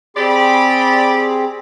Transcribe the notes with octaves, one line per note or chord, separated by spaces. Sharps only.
C4 G4 G#4 D5 B5